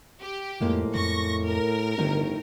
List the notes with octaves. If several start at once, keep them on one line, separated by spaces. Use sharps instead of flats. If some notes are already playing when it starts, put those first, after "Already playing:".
G4
F2 A2 F3 G#3 A#3
F2 C#6 A#6
A#4
G1 A2 D3 D#3 D#4